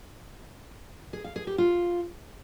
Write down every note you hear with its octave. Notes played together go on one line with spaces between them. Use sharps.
G#4
F5
G#4
G4
F4